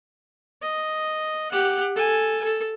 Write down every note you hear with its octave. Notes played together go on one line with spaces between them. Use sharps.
D#5
G4 F#5
A4 G#5
A4